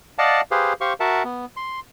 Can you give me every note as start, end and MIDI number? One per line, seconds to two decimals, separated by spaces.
0.19 0.41 74
0.19 0.41 75
0.19 0.41 77
0.19 0.41 78
0.19 0.41 81
0.51 0.73 67
0.51 0.73 68
0.51 0.73 71
0.51 0.73 72
0.51 0.73 77
0.81 0.93 67
0.81 0.93 72
0.81 0.93 77
0.81 0.93 85
1.00 1.23 66
1.00 1.23 70
1.00 1.23 76
1.00 1.23 78
1.00 1.23 81
1.24 1.45 59
1.57 1.80 84